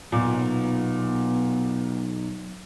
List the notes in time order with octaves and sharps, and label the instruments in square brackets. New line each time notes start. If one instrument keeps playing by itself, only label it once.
[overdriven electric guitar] B1 [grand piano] A#2 [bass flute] B3